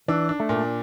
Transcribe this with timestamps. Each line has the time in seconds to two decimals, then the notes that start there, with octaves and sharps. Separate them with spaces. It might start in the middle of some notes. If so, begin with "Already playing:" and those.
0.08 E3 D4
0.29 D4
0.40 A3
0.49 A#2